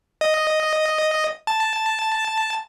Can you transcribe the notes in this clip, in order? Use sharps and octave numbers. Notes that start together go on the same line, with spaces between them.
D#5
A5